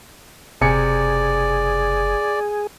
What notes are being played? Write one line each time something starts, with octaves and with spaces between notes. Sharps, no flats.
F#1 C3 G#4 D5 G#5 C#7